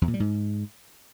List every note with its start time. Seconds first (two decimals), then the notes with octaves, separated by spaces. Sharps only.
0.02 E2
0.08 A#2
0.14 G3
0.20 G#2